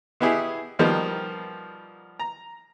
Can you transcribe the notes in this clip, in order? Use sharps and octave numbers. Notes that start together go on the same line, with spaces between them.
B2 B3 E4 G4 G#4
B2 D#3 F3 G3 A#3 B3
A#5